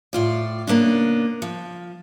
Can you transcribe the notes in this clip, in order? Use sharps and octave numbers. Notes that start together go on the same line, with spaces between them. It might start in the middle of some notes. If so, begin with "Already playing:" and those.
A2 F4 D5
C#3 A#3 B3 D4
F3